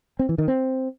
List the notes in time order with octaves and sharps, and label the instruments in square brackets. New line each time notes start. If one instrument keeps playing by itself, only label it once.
[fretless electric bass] C4
E3
D#3
C4